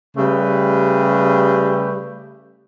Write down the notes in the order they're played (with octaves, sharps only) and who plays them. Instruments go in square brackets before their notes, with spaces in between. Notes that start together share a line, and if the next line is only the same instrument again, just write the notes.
[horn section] C#3 G3 A3 G4 B4